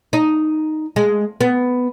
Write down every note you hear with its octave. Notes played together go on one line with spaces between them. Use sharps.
D#4
G#3
B3